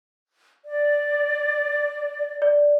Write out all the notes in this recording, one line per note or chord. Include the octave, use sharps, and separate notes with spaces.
D5
D5